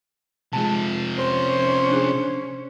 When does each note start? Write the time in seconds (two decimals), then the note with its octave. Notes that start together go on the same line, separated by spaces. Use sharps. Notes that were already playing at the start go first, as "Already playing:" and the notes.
0.53 C3 F3 G#3 A5
1.18 C#4 C5
1.90 D4 G#4